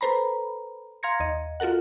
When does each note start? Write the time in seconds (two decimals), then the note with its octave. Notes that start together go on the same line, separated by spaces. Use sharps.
0.01 A4 B4 C5 A#5 B5
1.03 F5 A#5 C6 G#6 A#6 C#7
1.20 D#2 D#5
1.60 F4 F#4 A4 A#4 F#5